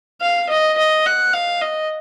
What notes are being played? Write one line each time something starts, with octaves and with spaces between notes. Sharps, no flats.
F5
D#5
D#5
F#5
F5
D#5